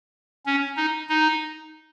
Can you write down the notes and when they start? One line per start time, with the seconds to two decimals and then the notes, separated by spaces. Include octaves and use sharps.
0.46 C#4
0.77 D#4
1.09 D#4